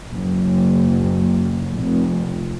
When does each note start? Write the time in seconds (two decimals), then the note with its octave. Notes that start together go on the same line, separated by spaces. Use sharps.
0.12 F#1
1.76 F1